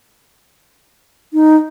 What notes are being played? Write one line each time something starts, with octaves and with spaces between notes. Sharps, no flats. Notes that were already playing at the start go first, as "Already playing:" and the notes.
D#4